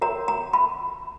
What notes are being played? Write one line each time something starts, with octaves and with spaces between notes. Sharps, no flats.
F#4 A#4 C#5 A#5
A#5
B5